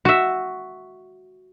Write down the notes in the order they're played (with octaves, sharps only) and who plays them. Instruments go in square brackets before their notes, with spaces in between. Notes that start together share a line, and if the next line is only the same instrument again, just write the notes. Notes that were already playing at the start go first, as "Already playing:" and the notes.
[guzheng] F#4 E5